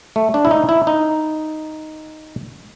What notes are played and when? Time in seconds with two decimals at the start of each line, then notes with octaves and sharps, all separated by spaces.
0.16 A3
0.34 D4
0.45 E4
0.51 D#4
0.69 E4
0.87 D#4